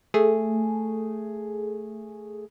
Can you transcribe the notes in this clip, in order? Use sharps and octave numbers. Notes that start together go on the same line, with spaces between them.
A3 G#4